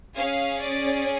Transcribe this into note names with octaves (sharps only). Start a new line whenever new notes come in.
C#4 G#4 F5
D5